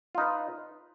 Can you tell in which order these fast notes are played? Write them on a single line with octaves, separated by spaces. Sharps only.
F4 D#4 B4